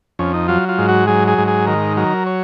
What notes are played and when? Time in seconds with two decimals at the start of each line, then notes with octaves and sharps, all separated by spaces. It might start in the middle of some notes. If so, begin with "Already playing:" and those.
0.19 F2 C#4
0.34 D#4
0.48 F#3 F4
0.69 F4
0.78 G#2
0.89 F#4
1.07 F#3 G#4
1.28 G#4
1.38 G#2
1.48 G#4
1.66 D#3 A#4
1.97 F#3 A#4
2.26 C#5